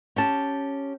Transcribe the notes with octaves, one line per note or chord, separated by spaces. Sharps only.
C#4 G4 A5